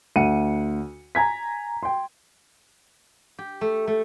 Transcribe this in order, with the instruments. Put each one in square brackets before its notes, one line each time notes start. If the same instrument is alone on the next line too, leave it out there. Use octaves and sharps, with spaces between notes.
[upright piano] D2 F#5 C#7 D#7
G#5 A#5 G#6 B6
G5 C6
[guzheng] G4
A3
A3